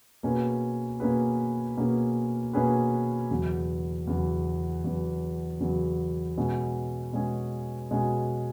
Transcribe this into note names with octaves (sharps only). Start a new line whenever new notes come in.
B2 A#3 C#4 G#4 B4
B2 A#3 C#4 G#4 B4
B2 A#3 C#4 G#4 B4
B2 A#3 C#4 G#4 B4
E2 C#3 F#3
E2 C#3 F#3
E2 C#3 F#3
E2 C#3 F#3
B2 G#3 C#4 G#4
B2 G#3 C#4 G#4
B2 G#3 C#4 G#4